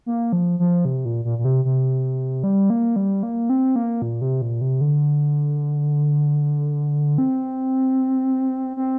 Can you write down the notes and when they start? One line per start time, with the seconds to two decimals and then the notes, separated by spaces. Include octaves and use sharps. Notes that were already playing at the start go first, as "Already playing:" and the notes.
0.06 A#3
0.33 F3
0.59 F3
0.85 C3
1.05 A#2
1.25 A#2
1.39 A#2
1.45 C3
1.65 C3
2.44 G3
2.70 A#3
2.96 G3
3.23 A#3
3.50 C4
3.76 A#3
4.02 A#2
4.21 C3
4.42 A#2
4.61 C3
4.81 D3
7.18 C4
8.77 C4